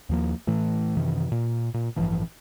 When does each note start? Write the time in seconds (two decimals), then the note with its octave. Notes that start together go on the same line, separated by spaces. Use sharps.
0.09 D#2 F3 A#3
0.47 A2 E3 A3
0.97 F#2 C3 D#3 E3
1.32 A#2
1.74 A#2
1.96 A1 G2 E3 F3